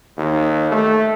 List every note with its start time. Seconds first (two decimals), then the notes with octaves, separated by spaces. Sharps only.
0.17 D#2
0.72 A3